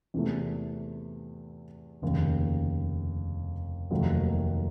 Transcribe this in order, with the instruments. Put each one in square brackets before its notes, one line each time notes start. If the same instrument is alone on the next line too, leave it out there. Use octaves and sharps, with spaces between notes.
[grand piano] E2 C3 E3 A3
F1 D#2 C#3
F1 D#2 D#3 F#3 A3